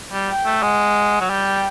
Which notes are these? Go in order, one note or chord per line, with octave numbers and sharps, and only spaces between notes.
G3
G5
A3
G#3 F#5
F#3
G3 G5